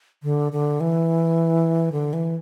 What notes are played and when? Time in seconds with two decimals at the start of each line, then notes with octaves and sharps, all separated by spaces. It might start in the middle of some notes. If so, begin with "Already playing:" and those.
0.23 D3
0.52 D3
0.80 E3
1.92 D3
2.13 E3